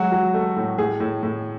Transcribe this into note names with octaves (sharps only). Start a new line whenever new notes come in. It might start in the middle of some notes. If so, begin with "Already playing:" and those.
Already playing: F#3 G#3 F#4
F#3
A3
A2
A2 G#4
A2
A2